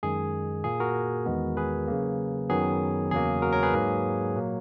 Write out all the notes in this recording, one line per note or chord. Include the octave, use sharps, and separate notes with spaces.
F#2 D#3 G#3 G#4
A#2 A#3 G#4
F#4 A#4
E2 D#3 G#3 B3
G#4 B4
C#3 F#3 A#3
F#2 D#3 F#3 B3 G#4
E2 C#3 F#3 A#3 G#4
F#4 A#4
A#4 C#5
G#4 B4
G#2 F#3 A#3
A#2 F#3 A#3